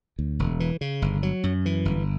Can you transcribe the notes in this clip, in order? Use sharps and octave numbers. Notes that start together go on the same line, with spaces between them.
D2
E1
E3
C#3
G1
F#3
F#2
E3
G1